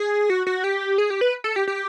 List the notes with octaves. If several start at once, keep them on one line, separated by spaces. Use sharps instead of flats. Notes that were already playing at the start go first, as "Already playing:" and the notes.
Already playing: G#4
F#4
F#4
G4
G#4
G4
B4
A4
G4
G4